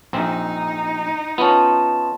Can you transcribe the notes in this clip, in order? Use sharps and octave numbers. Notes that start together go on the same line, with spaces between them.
A#1 C4 D#4
B3 C#4 F4 D#5 A5